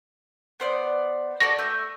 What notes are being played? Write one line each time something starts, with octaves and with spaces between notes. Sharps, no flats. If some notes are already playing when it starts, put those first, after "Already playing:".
B3 C5 D5
F#4 A4 D5 A#6
A3 E5 G6